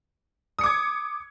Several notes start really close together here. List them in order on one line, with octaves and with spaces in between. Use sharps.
D#6 C#7 D6 G#6